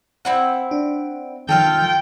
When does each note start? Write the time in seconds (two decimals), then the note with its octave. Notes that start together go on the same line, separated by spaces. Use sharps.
0.25 C4 E4 F#5
0.71 D4
1.49 D#3 F4 G4 A4 G5 F6